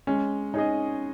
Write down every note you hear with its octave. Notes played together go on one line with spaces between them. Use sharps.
G#3 C#4
C#4 D#4 G#4 D#5